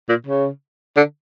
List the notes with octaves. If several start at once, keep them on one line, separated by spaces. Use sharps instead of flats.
A#2
C#3
D3